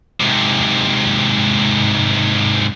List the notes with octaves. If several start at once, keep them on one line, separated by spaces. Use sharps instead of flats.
G#2 C3